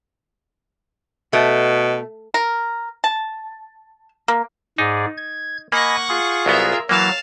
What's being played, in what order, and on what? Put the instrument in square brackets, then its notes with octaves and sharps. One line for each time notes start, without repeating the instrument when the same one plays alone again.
[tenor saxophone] B2 [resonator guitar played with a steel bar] A3
[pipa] A#4
A5
A#3
[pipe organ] G#2 G#4 D5 [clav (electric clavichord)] D#4
[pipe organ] G#6
[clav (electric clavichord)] A#3 [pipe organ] D#5 G#5 B5 [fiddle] F#5 C#6
[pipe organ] F4 G#4
[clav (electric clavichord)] C2 F#3 B3 [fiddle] A#4 E5
[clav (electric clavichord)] E3 A#3 [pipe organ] F#3 [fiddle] F5 A5